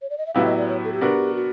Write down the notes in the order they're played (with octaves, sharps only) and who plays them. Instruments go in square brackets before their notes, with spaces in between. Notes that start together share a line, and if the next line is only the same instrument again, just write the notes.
[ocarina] C#5
D5
D#5
E5
[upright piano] A2 F#3 B3 E4 G4 [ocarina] F5
[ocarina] D#5
D5
C#5
A4
G4
[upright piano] B3 D4 F#4 A#4
[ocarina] F#4